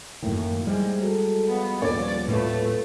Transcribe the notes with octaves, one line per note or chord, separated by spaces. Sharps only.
F#2 A2 D#3 A#3
G3 G#3 D#4 C5
F#3 A4
F2 B3
D#1 F3 B3 C#5 D5
A2 A3 F4 B4